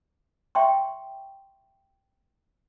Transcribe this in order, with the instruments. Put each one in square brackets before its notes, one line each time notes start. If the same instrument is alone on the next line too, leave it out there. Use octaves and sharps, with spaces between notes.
[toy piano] E5 G5 C6 C#6